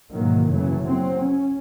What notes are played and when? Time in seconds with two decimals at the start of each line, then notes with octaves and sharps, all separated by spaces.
0.12 G#2 B2 D#3 E3 F#3 A#3
0.50 F#1 F#2 C#3 E3 F#3 A3
0.82 F#3 C4
1.23 C#4